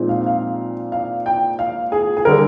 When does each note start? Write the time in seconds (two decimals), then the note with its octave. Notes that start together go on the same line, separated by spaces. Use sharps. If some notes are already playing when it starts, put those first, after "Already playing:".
Already playing: A#2 F3 G#3 C4 D#4
0.09 F5
0.26 F5
0.92 F5
1.26 G5
1.59 F5
1.92 G#4
2.17 G#4
2.25 D3 G3 A#4